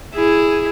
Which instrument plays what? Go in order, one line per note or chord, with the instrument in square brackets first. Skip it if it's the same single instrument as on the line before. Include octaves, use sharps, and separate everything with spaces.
[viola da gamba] E4 G#4